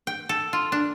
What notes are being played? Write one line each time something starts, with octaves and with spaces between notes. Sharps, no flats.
G5
A4
F4
D4